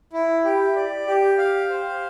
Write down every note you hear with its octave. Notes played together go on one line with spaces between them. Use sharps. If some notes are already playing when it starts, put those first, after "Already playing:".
E4
G4
D5
G4
F5
C5